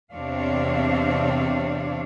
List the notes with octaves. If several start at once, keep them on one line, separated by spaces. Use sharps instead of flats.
E2 C3 C4 D4 C#5 F5